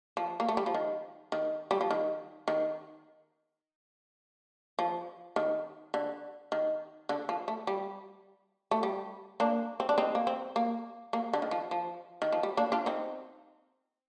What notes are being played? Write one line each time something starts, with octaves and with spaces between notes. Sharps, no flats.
F3
A#3
A3
G3
F3
D#3
D#3
G3
F3
D#3
D#3
F3
D#3
D3
D#3
D3
F3
A3
G3
A3
G3
A#3 D4
C4
D4
C4 D#4
A#3
C4
A#3
A#3
D3
D#3
F3
F3
D#3
F3
G3
A#3 D4
D4 F4
C4 D#4